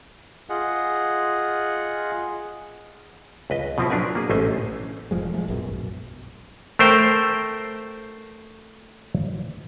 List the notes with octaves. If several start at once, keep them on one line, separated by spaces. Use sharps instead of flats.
F4 G#4 D#5 F#5
C#2 B4 D#5
B2 F3 C4 E4
F#3 D4 A#4 B4 G#5
A#3 G#4
A1 A3 C#4 C5 D#5 G#5
E1 F3 G#3
G#3 A3
A#1 F#2 B2
A3 A#4 C5 G5